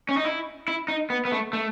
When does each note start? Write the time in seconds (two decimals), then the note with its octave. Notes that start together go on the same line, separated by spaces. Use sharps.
0.09 C#4
0.17 D#4
0.25 E4
0.68 E4
0.88 D#4
1.10 B3
1.25 B3
1.32 A3
1.53 A3